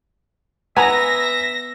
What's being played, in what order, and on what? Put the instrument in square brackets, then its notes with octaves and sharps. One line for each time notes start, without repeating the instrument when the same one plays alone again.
[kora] B3 [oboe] E5 [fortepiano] G#5 A#5 [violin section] A#6